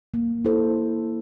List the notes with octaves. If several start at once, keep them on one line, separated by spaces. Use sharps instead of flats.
A#3
E4 A4 C5